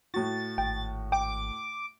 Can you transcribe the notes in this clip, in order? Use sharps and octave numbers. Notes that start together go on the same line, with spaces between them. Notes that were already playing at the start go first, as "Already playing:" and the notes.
A2 F#4 A6
G#1 G5
G5 D6